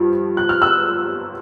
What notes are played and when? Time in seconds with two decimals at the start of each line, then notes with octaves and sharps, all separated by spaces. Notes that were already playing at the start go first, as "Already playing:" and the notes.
Already playing: G2 F3
0.37 F#6
0.49 F6
0.62 E6 F#6